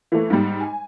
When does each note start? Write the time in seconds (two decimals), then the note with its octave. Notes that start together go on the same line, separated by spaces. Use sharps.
0.12 E3 A3
0.30 G#2 G3
0.60 G#5